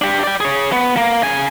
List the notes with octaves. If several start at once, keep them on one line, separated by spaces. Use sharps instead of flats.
D4 G4
D5 G5
G#4 C#5
B3
A#3
C#3 G#5